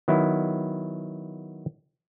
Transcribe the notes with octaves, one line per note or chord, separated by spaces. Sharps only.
D#3 F#3 B3 E4